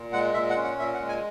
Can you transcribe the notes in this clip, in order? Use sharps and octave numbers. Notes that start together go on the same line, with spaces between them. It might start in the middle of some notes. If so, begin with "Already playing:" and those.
Already playing: A#2
G#3 F#5
A#2 E5
F#5
C#4
F#5
A#2 E5
F#5
G#3
G#5